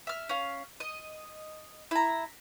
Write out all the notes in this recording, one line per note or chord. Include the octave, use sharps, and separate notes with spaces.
E5 F6
C#4 F5
D#5
E4 A#5